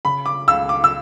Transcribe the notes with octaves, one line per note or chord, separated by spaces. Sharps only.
C#3 B5
D6
C#2 E6
D6
E6